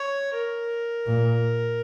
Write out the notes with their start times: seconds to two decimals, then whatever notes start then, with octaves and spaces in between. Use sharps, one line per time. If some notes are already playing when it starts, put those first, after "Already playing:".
Already playing: C#5
0.34 A#4
1.06 A#2